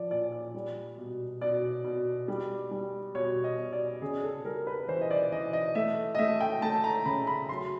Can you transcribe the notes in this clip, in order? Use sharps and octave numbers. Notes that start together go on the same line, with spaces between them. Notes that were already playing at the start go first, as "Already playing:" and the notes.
Already playing: F3 D5
A#2 D5
D5
G3
B2
B2 D5
B2
G3
G3
B2 C#5
D#5
B2
D5
C#3 G#4
A4
G3 A#4
B4
E3 C5
D#5
D5
E3 D#5
D#5
A3 E5
D#5
A3 E5
G5
A3 A5
A#5
C#3 B5
B5
F#3 C6